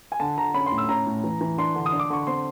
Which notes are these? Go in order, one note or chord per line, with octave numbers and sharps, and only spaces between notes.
G#5
D3 A5
D3 A#5
C#4 B5
C6
A2
E6
C#4 A#5
A2
E3
E3
D4 C6
D3
D#6
D4
D6
D3 C#6
C4 C6